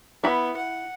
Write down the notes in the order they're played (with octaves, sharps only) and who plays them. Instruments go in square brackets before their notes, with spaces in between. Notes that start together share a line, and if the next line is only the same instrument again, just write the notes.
[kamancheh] B3 [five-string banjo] E4 B5
[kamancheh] F#5